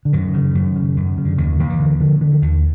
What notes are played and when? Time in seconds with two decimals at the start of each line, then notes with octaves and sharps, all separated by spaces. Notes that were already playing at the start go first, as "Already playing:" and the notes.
0.05 D3
0.13 F#2 D#3
0.34 C#3
0.55 F#2
0.76 C#3
0.97 F#2
1.18 C#3
1.25 D3
1.38 D#2 D#3
1.59 D#2
1.70 E3
1.80 D3
2.00 D3 F3
2.21 D3 E3
2.32 E3
2.42 D#2 D#3